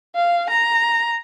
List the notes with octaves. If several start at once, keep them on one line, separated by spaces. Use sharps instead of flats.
F5
A#5